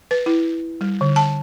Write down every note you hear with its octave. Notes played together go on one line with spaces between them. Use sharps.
B4
E4
G3
D3
A5